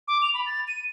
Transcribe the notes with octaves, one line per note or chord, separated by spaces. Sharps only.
D6
F7
B5
A6
D#7